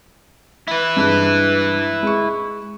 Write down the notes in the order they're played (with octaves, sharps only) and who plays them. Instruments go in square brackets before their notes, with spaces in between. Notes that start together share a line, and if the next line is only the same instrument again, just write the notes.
[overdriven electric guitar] E4 B4
[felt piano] G2 G#3 F#6
G#3 C#6